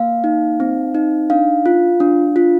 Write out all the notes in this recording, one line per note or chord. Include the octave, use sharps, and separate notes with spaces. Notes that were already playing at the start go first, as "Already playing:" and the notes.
Already playing: A#3 F5
D#4
C4
D#4
D4 F5
F4
D4
F4